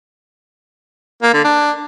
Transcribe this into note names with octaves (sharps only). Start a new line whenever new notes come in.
A#3
D3
D4